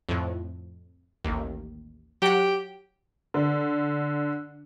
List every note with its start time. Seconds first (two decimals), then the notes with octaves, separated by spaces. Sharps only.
0.09 F2 A2
1.24 A1 D#2
2.22 F#3 G4 F#5
3.34 D3